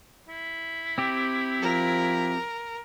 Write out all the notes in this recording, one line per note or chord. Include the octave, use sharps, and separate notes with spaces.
E4
C4 G4
F3 A#4